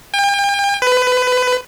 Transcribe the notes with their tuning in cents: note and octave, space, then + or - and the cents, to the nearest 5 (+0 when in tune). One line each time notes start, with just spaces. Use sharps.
G5 +40
B4 +25